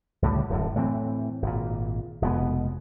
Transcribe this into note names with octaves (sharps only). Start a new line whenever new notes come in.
C#2 A2 D3 G3
D1 F#2 A2
A2 E3 C4
G#1 A#2
F1 B2 G#3 B3